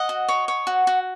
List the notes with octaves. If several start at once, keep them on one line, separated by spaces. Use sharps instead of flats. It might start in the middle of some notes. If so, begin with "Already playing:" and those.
Already playing: D#5 F#5
F#4
C#5
C#5
F#4
F#4